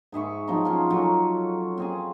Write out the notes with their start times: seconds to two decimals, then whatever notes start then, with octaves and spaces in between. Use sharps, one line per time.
0.12 G#2 G#4 E5 C#6
0.47 F3 F#3 C4 D#4
0.65 C#4 F4
0.90 F#3 F4 A4
1.78 C4 G#4 G#5